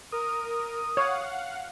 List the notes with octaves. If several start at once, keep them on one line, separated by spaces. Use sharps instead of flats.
A#4 D#6
C#5 F5 F#5